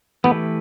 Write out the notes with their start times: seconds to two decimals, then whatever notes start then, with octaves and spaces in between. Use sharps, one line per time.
0.24 E3 A3 B3 E4 G4 B4